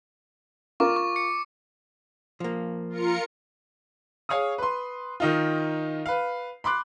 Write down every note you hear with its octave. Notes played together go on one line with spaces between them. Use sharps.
F4 A#4 C#6 D6
C#6
C#7
F3 A#3
F4 A#4 C#7
G#4 C#5 F5 C#6 D#6
B4 C6
D#3 D#4 F4
B4 F5
B5 C6 D6 F#6